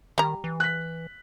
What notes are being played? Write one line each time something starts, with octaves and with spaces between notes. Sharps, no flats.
D#3 G3 A#5
E3
F#6 B6